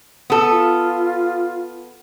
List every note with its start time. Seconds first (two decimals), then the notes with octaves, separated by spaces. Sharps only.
0.30 B3 A4
0.51 F4